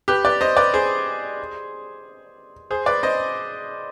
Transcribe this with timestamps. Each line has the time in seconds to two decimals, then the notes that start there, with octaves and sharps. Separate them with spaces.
0.08 G4 B4
0.25 B4 D5
0.41 C5 D#5
0.57 B4 D5
0.74 G#4 C5
2.71 G#4 C5
2.86 B4 D5
3.03 C5 D#5